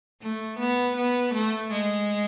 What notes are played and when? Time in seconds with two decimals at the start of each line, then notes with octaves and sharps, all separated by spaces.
0.22 A3
0.59 B3
0.96 B3
1.34 A3
1.72 G#3